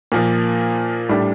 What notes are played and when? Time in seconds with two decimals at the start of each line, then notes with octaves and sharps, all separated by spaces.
0.12 A#2 F3 A#3
1.09 A2 G3 D4